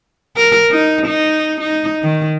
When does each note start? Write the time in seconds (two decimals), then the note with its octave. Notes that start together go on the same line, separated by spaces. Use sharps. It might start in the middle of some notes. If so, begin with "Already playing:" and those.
0.37 A#4
0.71 D#4
1.07 D#4
1.61 D#4
2.03 D#3